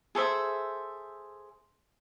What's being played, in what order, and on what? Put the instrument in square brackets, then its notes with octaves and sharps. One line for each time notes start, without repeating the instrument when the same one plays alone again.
[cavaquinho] G#4 A4 C5 E5